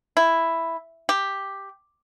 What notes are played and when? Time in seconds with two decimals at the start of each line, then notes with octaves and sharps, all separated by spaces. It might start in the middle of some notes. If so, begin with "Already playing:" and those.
0.17 E4
1.09 G4